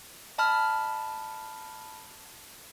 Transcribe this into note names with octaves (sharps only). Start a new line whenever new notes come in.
D#5 A5 B5 F6